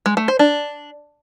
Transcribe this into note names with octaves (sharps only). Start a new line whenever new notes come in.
G#3
A3
C5
D4